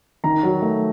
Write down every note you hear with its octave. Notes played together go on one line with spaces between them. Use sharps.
D#3 A#5
F#3
A3